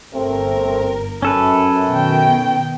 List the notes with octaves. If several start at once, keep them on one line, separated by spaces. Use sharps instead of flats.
G1 C3 A3 C4 A#4
F#2 C#4 A4 B4
B2 D#3 G5